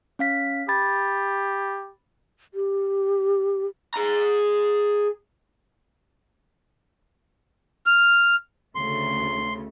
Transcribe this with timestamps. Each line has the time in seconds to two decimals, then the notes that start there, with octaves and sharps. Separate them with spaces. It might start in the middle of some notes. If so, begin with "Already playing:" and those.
0.19 C#4 F5 B6
0.69 G4 B5 A6
2.54 G4
3.94 G#4 A#5
7.86 F6
8.75 D2 C#3 A3 C6